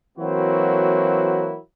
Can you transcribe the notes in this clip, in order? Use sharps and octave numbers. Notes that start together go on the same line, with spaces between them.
E3 F#3 A#3 C4 E4 F#4